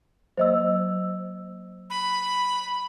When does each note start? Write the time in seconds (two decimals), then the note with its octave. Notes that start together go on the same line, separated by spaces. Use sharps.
0.37 F#3 A#3 C5 D#5 E6
1.90 B5